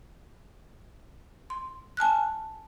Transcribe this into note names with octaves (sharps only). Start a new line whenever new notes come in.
C6
G#5 A5 F6 F#6